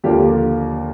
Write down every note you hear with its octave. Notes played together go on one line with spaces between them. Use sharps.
D#2 D3 F3 A#3 G4